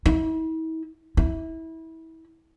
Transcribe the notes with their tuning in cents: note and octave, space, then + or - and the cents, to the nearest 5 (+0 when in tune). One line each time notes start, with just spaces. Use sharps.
E4 -45
E4 -25